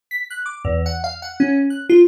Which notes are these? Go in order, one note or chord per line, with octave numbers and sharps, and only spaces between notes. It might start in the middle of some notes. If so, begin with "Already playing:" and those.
B6
F#6
D6
E2
F#5
F5
F#5
C#4
F#6
F4